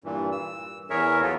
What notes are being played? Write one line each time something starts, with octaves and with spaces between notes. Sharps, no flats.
G2 A#2 E3
E6
E2 G#4 A#4 C#5 E5
F3 F#3 B3 F4 A4